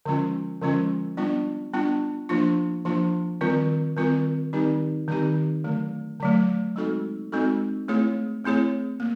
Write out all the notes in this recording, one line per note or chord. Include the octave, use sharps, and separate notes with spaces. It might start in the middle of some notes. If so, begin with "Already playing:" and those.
D3 F3 G#3 C#4 F4
D3 F3 G#3 C#4 F4
G3 B3 D4 F4
G3 B3 D4 F4
F3 A#3 D4 F4
F3 A#3 D4 F4
D#3 G3 C4 F4 A#4
D#3 G3 C4 F4 A#4
D#3 G3 C4 D#4 G4
D#3 G3 C4 D#4 G4
D3 F#3 A3
D3 F#3 A3
G#3 C4 D#4 F#4 A4
G#3 C4 D#4 F#4 A4
A3 C4 E4 G#4 C#5
A3 C4 E4 G#4 C#5
A#3